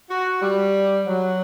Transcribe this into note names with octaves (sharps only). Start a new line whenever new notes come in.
F#4
G3
F#3